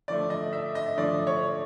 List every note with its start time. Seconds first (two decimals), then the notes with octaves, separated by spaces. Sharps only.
0.08 D3 F3 A3 D5
0.30 D#5
0.53 E5
0.75 D#5
0.97 D3 F3 A3 D5
1.27 C#5